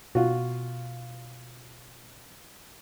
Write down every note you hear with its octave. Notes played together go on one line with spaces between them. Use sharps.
B2 F4 F#4